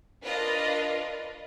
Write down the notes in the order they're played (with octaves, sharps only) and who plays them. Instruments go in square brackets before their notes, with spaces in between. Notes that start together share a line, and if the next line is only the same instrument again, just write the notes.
[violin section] D4 F4 A#4 B4 D5 D#5